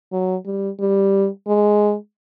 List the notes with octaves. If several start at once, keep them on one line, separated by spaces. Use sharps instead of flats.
F#3
G3
G3
G#3